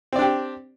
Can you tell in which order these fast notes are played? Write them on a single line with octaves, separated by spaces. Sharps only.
C4 D5 D4 G4